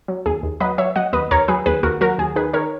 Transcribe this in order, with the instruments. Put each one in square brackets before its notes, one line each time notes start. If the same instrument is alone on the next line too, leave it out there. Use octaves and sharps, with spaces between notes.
[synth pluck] F#3
D#2 G#4
D#2
F#3 B4 D#5
F#3 C#5 E5
F#3 D#5 F#5
D#2 B4 D#5
D#2 A#4 C#5
F#3 G#4 B4
D#2 G#4 B4
D#2 F#4 A#4
F#3 F#4 A#4
D#2 G#4
D#3 G#4 B4
D#3 A#4 C#5